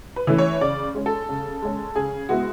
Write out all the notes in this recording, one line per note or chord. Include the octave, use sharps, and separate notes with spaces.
B4
E3 A3 C#4 E4
C#5
C#3 D5
G#3 C#4
A4
C#3
G#3 C#4
C#3 G#4
G#3 B3 E4 F#4